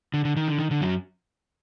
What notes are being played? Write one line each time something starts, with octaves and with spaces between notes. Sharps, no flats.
D3
D3
D#3
D3
D#3
D3
F#2 F#3